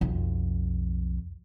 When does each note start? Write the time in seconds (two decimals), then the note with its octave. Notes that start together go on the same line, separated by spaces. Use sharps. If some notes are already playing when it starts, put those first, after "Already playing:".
0.01 B1 F2